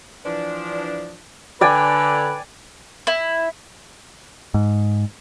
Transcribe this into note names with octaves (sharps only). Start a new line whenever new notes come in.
E3 F3 D4
D3 B4 D5 G5 G#5
E4
G#2